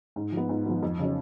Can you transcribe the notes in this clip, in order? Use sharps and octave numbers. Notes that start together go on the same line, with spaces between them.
G#2
F3
B3
G#2
F3 B3
F2
C#3 F#3 C#4